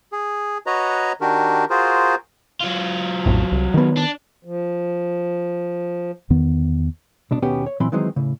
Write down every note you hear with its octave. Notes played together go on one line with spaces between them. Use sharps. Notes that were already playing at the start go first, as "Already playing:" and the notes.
G#4
F#4 B4 C#5 D#5 A#5
D#3 D4 F#4 G4 A#4
F4 F#4 G#4 A#4 C5
F#3 F4
A#1 F2 A2
C2
D#3 B3
D4
F3
E2 D#3 B3
C2 B2 D4
D#2 B2 B3 C#4 G4
C#5
A#2 E3 F#3 C4 B5 C6
D#3 E3 F#3 G#3 C4 D#4
A2 C#3